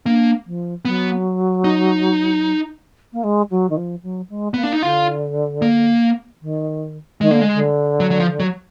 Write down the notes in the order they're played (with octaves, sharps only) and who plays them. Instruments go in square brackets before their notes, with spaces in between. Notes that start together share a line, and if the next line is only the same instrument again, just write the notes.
[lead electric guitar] A#3 [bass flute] D4
[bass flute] F3
[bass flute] F#3 [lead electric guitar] B3
[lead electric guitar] D#4
[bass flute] A#3
G#3
F#3
D#3
F3
F#3
G#3
[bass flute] A#3 [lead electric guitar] B3
[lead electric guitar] D4
D#4
[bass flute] D3 [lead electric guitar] F4
[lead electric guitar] A#3
[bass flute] D#3
[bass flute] D#3 [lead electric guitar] G#3
[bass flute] D3 [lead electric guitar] A#3
[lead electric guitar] G#3
[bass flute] D3
[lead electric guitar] F#3
F#3
F3
F#3